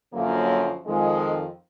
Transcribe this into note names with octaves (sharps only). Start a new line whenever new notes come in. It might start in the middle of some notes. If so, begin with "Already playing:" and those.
F#2 D3 F3 F#3 A#3
F2 D#3 F3 G#3